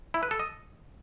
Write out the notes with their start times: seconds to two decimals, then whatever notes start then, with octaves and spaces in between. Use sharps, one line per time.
0.14 E4
0.23 B4
0.31 A4
0.39 D#5